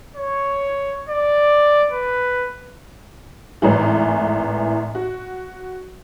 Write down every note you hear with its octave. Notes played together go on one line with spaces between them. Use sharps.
C#5
D5
B4
G#1 A2 E3
F#4